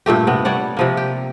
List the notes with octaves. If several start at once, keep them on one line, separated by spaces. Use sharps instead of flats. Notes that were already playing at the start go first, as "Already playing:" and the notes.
G2 A#2 A3 G4
C3 B3
G3 C#5 D5 F#5
C3 F3 A#3
G4